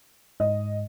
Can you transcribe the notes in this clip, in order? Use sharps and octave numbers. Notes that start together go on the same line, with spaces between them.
G#2 D#5